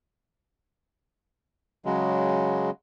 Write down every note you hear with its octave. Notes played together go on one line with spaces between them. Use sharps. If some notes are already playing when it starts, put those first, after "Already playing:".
C#3 F#3 G#3